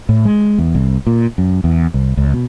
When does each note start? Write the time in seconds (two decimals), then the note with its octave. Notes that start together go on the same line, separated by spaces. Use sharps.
0.09 A2
0.25 G#3
0.58 E2
0.75 C2
1.07 A#2
1.38 F#2
1.64 E2
1.94 C2
2.17 C#2
2.33 B2